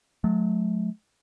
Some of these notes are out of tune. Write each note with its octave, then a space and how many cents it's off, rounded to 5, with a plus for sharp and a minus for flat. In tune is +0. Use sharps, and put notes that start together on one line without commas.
F#3 -30 A3 -35